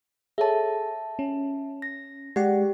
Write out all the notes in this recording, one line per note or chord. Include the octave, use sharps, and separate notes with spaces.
G#4 A4 C#5 E5 A5
C#4
A#6
G#3 G4 D5 F#5